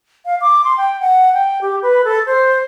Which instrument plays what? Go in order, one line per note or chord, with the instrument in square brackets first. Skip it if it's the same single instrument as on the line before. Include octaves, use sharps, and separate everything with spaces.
[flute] F5
D6
C6
G5
F#5
G5
G4
B4
A4
C5